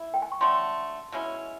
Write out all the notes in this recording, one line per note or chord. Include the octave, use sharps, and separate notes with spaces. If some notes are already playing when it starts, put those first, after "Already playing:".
Already playing: A3 E4
G5
G#5
C#6
D3 F#3 A3 C6
B2 G#3 C#4 E4